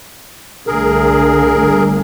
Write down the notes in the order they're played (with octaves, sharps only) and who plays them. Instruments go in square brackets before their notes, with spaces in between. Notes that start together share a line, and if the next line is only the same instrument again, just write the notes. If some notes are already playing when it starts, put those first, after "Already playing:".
[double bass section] C2 D3 A3 [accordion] G#4 A#4
[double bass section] G1 D3 A3